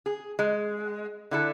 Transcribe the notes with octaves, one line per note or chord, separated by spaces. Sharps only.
G#4
G#3
D3 E4 A4